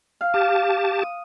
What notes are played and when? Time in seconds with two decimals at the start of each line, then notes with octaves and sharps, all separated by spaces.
0.21 F5
0.34 G4 A5
1.02 D#6